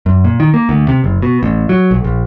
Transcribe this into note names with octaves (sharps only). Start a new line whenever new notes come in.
F#2
A#2
D#3
A#3
D2
C3
F#1
B2
A1
F#3
B1
A#1